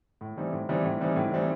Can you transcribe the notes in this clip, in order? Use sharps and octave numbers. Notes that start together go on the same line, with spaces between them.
A2
E3 G3 C4 D#4
A2
E3 G3 C4 D#4
A2
E3 G3 C4 D#4
A2
E3 G3 C4 D#4